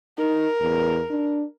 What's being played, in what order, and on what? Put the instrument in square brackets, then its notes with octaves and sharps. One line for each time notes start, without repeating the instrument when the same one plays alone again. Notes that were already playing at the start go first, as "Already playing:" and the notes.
[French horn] D#4 [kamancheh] A#4
[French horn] E2
D4